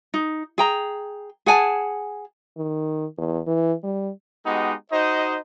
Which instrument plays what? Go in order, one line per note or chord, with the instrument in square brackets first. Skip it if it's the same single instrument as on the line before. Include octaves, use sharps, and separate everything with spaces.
[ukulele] D#4
G#4 G5 A#5
G#4 F#5 G#5 A5
[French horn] D#3
E2
E3
G3
[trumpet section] G#3 B3 D#4 F#4 G4
D#4 F#4 C5 D#5